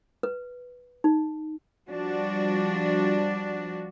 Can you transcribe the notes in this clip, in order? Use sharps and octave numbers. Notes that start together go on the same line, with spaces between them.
B4
D#4
F3 G3 D4 F#4